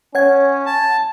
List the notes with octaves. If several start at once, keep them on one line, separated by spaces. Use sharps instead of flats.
C#4 C#5 F#5 G#6
A5